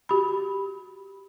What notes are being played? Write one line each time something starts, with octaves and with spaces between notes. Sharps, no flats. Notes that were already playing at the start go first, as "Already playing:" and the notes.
F#4 G4 B5